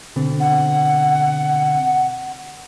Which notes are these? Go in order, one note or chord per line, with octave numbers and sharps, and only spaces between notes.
B2 D3 C4
F#5